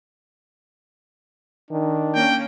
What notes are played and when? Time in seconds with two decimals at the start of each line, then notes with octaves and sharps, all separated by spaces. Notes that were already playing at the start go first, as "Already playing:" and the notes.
1.71 D#3 D4
2.15 A#3 C#4 G5